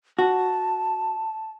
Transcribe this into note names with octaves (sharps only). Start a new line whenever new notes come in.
F#4 A5